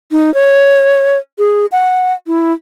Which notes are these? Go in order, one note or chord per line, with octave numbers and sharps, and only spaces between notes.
D#4
C#5
G#4
F#5
E4